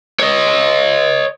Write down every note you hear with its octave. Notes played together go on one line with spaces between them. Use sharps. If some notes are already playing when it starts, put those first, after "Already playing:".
C#5 D#5